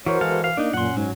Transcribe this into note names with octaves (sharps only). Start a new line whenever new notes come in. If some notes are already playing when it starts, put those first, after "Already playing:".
E3 F#4 A#4 C5 C#5
E3 G#3 A4 F5
F5
A#3 D4 D#4
F#2 A#2 C#4 F#5 C6
G#2 F#3